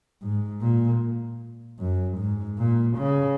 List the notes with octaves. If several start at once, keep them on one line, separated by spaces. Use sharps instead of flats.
G#2
A#2
F#2
G#2
A#2
C#3